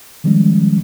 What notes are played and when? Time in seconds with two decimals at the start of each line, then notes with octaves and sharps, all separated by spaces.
0.24 D#3 F3 G3 G#3 C#4